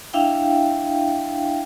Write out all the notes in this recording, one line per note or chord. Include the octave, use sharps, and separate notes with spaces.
D4 E4 E5 F5 G5